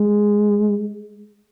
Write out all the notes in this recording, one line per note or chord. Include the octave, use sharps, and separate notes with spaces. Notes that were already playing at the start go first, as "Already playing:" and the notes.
Already playing: G#3